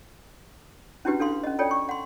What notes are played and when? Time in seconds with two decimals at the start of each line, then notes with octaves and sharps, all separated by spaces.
1.05 C#4 D4 E4 F#4 G4 B4
1.19 D4 A4 F5 C6
1.44 C#4 D#5
1.59 F4 A4 C#5 D5 G5
1.71 C#6
1.89 F#5 C6